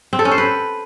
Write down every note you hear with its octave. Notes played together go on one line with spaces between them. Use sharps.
C4
A4
C#4
C5
B4